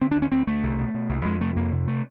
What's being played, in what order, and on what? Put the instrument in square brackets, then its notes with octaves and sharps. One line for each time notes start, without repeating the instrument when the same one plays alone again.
[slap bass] D3 C4
D4
D2
C#4
D2 C4
D2 A3
C2
B2
B2
C2
F2 G#3
C3 A3
F2 A#3
C3
A3